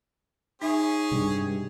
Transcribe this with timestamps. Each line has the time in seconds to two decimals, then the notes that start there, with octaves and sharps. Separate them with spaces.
0.62 C#4 D#4 G#4 E5
1.11 G2 C3 G3 G#3